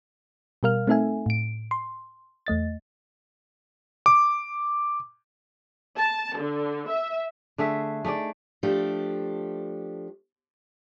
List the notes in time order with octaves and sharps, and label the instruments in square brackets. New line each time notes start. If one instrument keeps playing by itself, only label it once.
[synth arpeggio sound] B2 G3 A#4 F5 F6
A3 C4 D#4 A4 E5 G#5
A2 D7
C6
E2 A3 D#5 A6
[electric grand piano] D6
[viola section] A5
D3
E5
[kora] D3 A3 G#4 E5
A3 D#4 G#4 D5
[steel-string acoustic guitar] F3 A3 D4 G4